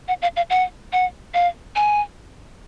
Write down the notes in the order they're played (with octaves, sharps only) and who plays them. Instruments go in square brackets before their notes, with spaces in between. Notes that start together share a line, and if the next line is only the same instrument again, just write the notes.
[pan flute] F#5
F5
F5
F#5
F#5
F5
G#5